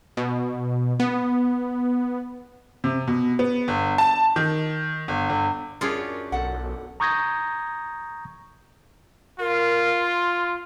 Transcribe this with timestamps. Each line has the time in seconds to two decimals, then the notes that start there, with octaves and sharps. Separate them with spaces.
0.17 B2
1.00 B3
2.84 C3
3.07 B2
3.39 B3
3.68 G1
3.98 A5
4.36 D#3
5.08 G1
5.30 G1
5.81 F#2 C#4 D4 F4 G#4 C#5
6.32 B1 A4 F#5
7.00 A#5 C#6 D#6 G6 G#6 A#6
9.40 F4 A#4
10.01 C6